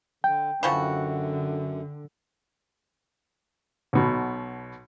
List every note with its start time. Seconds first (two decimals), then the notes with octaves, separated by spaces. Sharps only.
0.24 D3 G5
0.63 F#2 D3 E3 F3 F#4
3.93 B1 B2